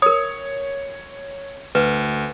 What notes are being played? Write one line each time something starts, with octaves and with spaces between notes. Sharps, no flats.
A#4 C#5 D#6
D2 B4